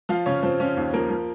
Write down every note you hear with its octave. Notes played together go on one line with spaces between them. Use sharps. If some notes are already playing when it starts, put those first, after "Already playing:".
F3 F4 F5
C#3 C#4 C#5
F3 C4 C5
F3 C#4 C#5
D#2
F3 A#3 A#4
F3